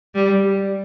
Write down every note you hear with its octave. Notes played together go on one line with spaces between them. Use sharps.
G3